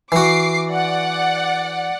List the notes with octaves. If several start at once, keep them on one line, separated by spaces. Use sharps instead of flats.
E3 F#4 D6 C7
D5 F#5